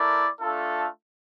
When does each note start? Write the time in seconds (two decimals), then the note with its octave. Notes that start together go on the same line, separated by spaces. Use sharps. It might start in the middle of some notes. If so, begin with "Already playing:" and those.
Already playing: A3 E4 A#4 D5
0.39 A3 D4 F4 A4